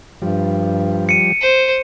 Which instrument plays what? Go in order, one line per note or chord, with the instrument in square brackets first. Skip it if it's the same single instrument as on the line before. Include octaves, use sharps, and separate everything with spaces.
[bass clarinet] G2 [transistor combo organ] F3 G3
[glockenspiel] C#7 D#7
[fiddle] C5